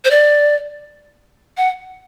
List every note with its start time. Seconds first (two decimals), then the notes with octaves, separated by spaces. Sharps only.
0.05 C5
0.11 D5
1.57 F#5